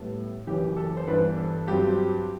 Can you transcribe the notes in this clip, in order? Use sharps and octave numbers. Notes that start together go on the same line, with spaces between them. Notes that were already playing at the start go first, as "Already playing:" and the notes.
Already playing: A2 G3 B3 A4
F#1 F#2 E3 G4
A4
C5
G2 E3 B3 D4 B4
A4
G2 F#3 C4 G4